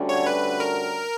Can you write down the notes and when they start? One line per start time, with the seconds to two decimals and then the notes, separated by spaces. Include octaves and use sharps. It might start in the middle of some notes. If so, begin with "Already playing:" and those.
Already playing: D2 D3 G3 C#4 F#4
0.09 C#5
0.27 B4
0.60 A#4